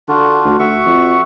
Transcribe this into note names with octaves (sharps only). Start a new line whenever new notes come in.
D3 D4 F4 F#4
D2
D2 F#4 E5 C#6
F2